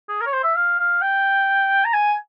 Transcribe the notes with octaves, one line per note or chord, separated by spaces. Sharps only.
G#4
A#4
C#5
C5
E5
F5
F5
G5
A#5
G#5